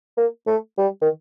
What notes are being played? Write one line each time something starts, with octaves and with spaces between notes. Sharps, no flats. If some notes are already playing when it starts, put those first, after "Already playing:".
A#3
A3
G3
D#3